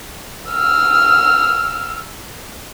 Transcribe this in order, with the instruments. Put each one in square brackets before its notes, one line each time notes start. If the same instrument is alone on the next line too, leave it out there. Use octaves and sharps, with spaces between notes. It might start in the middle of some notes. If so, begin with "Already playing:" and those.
[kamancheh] E6 F6